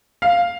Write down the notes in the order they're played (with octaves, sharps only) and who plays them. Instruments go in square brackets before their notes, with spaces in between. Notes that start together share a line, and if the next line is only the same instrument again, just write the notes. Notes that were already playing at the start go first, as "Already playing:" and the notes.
[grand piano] F5